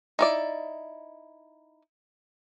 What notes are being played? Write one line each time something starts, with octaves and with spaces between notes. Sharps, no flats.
D#4 E4 D5